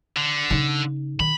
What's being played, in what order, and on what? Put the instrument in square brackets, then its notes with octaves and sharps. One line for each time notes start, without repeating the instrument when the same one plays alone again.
[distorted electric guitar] D3
[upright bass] C#3 D#4
[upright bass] D#3 [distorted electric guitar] B5